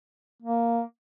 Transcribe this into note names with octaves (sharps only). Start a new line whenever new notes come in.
A#3